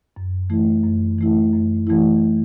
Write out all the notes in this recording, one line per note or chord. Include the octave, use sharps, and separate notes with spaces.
F#2
E3 A3 E4
F#2
E3 A3 E4
F#2
E3 A3 E4